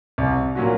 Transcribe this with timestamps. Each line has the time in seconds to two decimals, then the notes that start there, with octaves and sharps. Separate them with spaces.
0.18 C2
0.55 A#2 F#3 C#4 F#4